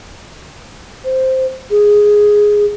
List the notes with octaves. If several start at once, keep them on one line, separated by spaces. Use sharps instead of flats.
C5
G#4